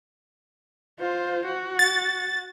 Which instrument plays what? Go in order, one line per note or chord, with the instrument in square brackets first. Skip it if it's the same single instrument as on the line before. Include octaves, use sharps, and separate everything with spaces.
[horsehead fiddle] F4 C5
F#4
[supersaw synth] A6